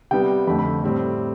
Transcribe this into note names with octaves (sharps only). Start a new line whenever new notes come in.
C3 G3 B3 G5
F2 D3 A3 B5
B5
A2 G3 C4